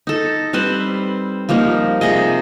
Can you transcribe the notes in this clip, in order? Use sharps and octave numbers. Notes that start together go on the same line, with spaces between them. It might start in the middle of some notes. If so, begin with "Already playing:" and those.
D#4 A4
G3 C4 B4 C5
F3 G3 A#3 D#4
C3 G#4 D#5